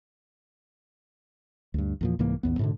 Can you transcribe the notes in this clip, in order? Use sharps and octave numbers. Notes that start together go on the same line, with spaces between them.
D2 G2
E2 A#2 F3
C2 G#2 E3 A#3
A1 D#2 B3
G#2 B2 D3